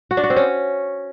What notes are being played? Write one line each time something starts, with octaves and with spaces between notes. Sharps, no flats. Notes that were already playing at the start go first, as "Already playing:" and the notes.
F#4
D4
F#4
C4
C#4